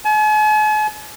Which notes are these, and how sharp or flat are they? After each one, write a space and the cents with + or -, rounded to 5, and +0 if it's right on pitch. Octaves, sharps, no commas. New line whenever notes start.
G#5 +45